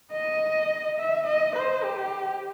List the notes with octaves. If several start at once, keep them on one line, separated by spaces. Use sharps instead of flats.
D#5
E5
D#5
C5
G4